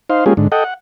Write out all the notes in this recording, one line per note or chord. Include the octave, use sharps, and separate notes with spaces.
D#4 C5 F5
G#3 A#3 C#4 F4 G4 G#4
G#2 D3
A4 D#5 F#5 G5
F#5